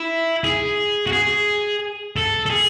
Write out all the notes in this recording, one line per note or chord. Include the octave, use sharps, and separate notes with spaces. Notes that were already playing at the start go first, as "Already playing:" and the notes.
Already playing: E4
G#4
F#4
G#4
A4
A4
G#4